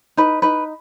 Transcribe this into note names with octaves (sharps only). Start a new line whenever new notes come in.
D#4 B4
D#4 B4